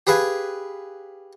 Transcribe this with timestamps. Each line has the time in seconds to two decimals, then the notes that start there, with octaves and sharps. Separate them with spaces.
0.07 G4 G#4 B4 F5 G#5